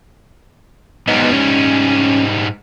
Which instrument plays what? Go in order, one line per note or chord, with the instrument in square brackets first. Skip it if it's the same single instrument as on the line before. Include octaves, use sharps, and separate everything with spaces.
[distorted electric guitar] G#2 G3 [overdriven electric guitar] B3 D#4
[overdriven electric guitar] C#4